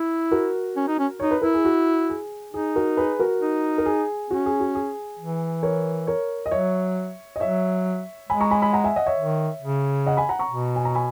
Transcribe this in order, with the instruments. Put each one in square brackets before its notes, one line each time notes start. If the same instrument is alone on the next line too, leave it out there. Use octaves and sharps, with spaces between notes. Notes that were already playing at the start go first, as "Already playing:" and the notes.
Already playing: [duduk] E4
[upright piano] F#4 A#4
[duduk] C#4
D#4
C#4
[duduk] D#4 [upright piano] C#5
[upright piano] B4
[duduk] E4 [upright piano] A#4
[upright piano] G#4
F#4
G#4
[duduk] D#4 [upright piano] G#4
[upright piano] F#4 A#4
G#4 B4
F#4 A#4
[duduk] D#4
[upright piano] A#4
G#4
[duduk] C#4 [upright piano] F#4
[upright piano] G#4
F#4
G#4
[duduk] E3
[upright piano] A#4 C#5
A#4 C#5
D#5
[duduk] F#3 [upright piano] C#5 E5
[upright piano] D#5
[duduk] F#3 [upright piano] C#5 E5
[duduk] G#3 [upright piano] G#5 B5
[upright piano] A#5 C#6
G#5 B5
G#5 B5
F#5 A#5
E5 G#5
D#5 F#5
C#5 E5
[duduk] D#3
C#3
[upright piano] D#5 F#5
G#5 B5
F#5 A#5
A#5 C#6
[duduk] B2
[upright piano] G#5
A#5
G#5 B5